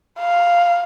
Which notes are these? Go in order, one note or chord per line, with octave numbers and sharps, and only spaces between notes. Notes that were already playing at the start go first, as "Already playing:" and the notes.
F5